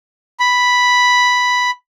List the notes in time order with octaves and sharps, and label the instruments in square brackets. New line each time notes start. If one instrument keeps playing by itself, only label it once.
[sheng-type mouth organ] B5